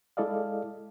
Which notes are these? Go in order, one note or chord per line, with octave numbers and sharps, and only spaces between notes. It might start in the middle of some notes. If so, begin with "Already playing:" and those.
G#3 E4 A4 D5 D#5 F5